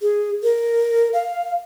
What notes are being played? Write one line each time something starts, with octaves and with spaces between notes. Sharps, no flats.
G#4
A#4
F5